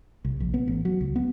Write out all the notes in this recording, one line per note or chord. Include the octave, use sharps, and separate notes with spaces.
C2
A#1
B3
A1
F#3
C#2
B3